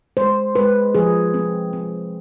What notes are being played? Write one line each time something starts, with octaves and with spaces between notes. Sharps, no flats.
G#3 C5
G#3 B4
F3 G#4
C4
C4